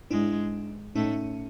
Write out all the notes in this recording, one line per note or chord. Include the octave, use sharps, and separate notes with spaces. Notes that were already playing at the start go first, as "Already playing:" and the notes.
G#2 G#3 D4 E4
A2 A3 C#4 D#4